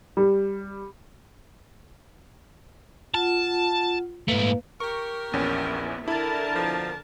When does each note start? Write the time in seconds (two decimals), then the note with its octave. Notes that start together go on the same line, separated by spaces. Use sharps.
0.17 G3
3.14 F4 F#5 A5
4.28 G#2 A3 A#3 B4 F5
4.80 G4 A#4 C#6
5.33 A#1 E2 B3 C#4 E4
6.08 D3 E4 A#4 A5
6.55 F2 B2 F3